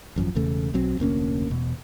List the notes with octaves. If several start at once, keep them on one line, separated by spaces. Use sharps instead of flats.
G#1 F#2 A2 F3
E1 E2 C#3 A3
B1 F#3 C4
F1 D2 A#3 C#4
E1 B2